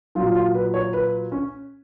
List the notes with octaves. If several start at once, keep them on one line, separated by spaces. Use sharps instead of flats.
A#2 F#3 F4
F4
B4
C#5
B4
C#4